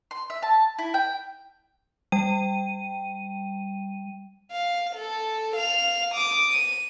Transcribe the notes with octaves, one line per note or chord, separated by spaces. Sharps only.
C6
E5
A5
E4
G5
G3 G5 D#7
F5
A4
F5 F7
D6 D#6
D#7